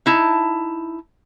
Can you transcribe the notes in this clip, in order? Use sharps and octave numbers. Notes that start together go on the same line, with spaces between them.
D#4 E4 A5